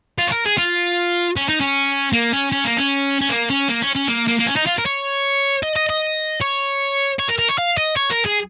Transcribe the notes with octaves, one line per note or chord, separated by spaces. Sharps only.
F4
C#5
A#4
G#4
F4
C#4
D#4
C#4
A#3
C#4
C#4
A#3
C#4
C#4
A#3
C#4
A#3
C#4
C#4
A#3
A#3
A#3
C#4
D#4
F4
A#4
C#5
D#5
D#5
D#5
C#5
C#5
A#4
A#4
C#5
F5
D#5
C#5
A#4
G#4